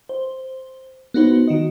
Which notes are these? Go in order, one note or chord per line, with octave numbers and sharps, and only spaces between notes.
C5
B3 D#4 F#4 B4 C5
D#3 F#4 D#5